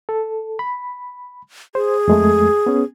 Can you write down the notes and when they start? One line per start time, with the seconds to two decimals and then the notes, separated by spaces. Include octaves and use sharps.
0.09 A4
0.59 B5
1.75 G#4 C5
2.08 F2 G#3 A3
2.66 B3 C#4